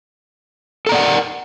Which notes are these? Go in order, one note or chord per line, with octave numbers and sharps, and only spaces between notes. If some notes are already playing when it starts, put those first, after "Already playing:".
A4 A#4 D5 F#5 A#5